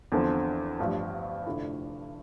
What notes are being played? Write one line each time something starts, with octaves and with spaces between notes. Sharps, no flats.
E2 D3 F3 C4
A1 G2 F3
F1 F2 D3 A3 E4